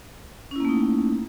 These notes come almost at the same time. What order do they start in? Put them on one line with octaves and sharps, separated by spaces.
C#4 E4 A#3 A3 D#4